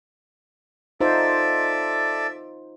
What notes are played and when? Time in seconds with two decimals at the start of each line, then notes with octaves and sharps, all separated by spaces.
1.01 D#4 F4 A4 C5 D5 E5